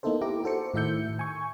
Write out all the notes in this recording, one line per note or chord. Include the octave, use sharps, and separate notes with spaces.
A#3 B3 D#4 E4 A4 C5
E4 G4 A#5 D6
F#4 A4 C5 C#7
A2 D#3 E4 E5 G6 C#7
G#5 C#6